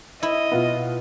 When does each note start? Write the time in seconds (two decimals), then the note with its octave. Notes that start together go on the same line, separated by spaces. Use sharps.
0.23 E4 D#5
0.52 B2 B3 F4